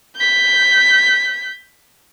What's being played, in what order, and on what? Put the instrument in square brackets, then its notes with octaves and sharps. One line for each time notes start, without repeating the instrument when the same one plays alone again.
[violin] G6 B6